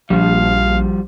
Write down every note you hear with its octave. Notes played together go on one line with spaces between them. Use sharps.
A#1 F3 G3 F5